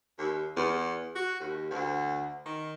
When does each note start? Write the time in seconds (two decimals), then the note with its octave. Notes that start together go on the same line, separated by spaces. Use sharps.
0.18 D#2
0.56 E2
1.16 F#4
1.40 D#2
1.70 D2
2.46 D#3